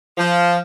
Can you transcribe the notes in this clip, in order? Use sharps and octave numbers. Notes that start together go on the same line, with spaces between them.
F3